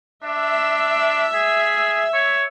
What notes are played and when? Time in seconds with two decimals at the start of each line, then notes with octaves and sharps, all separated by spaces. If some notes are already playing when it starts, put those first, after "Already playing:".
0.24 D4 E5
1.34 G#4
2.14 C#5